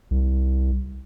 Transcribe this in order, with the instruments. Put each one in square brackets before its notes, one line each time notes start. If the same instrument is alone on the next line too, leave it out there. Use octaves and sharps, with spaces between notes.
[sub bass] C2